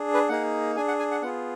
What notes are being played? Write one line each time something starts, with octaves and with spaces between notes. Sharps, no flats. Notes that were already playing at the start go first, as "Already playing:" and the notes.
Already playing: D4 G#4
B4
A#3 D#4 G#4 F#5
D4 G#4 G#5
F#5
G#5
F#5
B3 F4 G#4 F#5